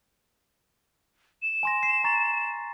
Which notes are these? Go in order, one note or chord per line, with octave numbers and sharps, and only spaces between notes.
E7
G#5 C6 A#6
C7
A#5 C#6 A6